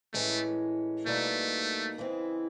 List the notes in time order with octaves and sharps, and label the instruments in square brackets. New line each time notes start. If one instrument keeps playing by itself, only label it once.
[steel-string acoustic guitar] A2 E3 G#3 C#4 [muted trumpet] A3
[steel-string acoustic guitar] B2 G3 A#3 D#4 [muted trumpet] A3
[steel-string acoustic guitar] C#3 E3 G#3 C4 E4